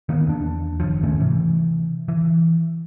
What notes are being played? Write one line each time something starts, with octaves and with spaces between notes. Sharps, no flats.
D#3 A#3 B3
E2 D4
F#1 D#2 F3
G#2 D#3 A3 C#4
C3 E3
E3